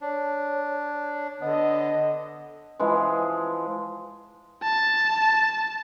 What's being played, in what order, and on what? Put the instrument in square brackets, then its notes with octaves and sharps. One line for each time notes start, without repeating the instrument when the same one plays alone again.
[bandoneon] D4 [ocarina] C#5
[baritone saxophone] D3 [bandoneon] B3 [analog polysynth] D#5
[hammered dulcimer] E3 F3 G#3
[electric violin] A5